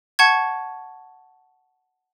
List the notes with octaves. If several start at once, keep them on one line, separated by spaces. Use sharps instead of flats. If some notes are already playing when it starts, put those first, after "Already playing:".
F#5 A5 C#6 G#6